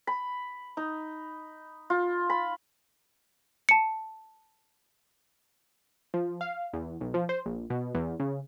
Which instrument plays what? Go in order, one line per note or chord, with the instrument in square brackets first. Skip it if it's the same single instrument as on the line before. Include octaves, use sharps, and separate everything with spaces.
[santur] B5
D#4
F4
B5
[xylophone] A5 C#7
[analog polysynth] F3
F5
E2
B1
F3
C5
A#1
B2
E2
C#3